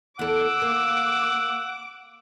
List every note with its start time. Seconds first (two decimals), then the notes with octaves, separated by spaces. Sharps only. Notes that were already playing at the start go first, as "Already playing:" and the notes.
0.19 E2 A4 F#5 D6 E6
0.62 A#3